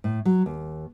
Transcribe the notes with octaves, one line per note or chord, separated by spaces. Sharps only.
A2
F#3
D#2